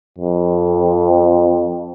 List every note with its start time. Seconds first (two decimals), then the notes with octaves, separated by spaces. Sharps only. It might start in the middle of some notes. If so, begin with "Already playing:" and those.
0.18 F2